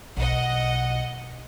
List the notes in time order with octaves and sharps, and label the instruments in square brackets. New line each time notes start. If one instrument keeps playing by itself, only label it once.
[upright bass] B1 [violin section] D#5 F#5